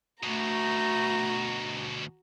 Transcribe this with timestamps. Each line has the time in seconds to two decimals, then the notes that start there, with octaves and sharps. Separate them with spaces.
0.24 D2 B2 A3 F#4 A#5